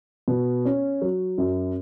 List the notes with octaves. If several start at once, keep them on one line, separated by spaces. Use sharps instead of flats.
B2
C#4
F#3
F#2